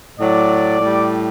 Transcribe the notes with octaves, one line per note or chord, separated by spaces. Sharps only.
A2 F#3 D5
A2 G3